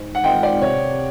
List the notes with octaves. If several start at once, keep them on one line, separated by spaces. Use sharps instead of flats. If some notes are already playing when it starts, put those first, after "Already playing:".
Already playing: G#2
F#5
D#3 G#3 C4 F4 G5
D5
C3 C#5